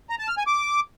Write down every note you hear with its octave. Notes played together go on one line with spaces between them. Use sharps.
A#5
A5
F6
G#5
D6